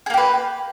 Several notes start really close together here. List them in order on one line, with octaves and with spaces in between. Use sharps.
G#4 A#3 G4 B4